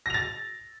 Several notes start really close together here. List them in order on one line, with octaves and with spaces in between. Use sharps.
A#6 F7 A6